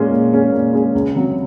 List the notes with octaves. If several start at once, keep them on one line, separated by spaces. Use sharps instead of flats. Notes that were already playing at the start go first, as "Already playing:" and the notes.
Already playing: A#2 G#3 C#4 G#4
A#2
G#3 C#4 G#4
A#2
G#3 C#4 G#4
C#2
C3 F#3